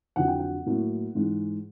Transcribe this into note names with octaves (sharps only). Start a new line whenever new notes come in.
F2 D3 F#3 F#5
G5
F#5
A2 F#3 A#3
G#2 E3 G#3